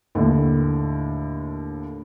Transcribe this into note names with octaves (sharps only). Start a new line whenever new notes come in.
D#2 A2 D3